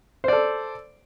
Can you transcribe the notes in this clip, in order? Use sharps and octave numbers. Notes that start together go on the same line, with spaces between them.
A4 C5 D5